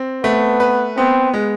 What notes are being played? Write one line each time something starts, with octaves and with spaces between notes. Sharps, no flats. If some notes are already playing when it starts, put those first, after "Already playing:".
Already playing: C4
A3 B3
B4
B3 C4
G#3